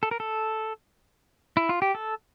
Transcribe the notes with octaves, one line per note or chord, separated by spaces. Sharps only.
A4
A#4
A4
E4
F4
G4
A4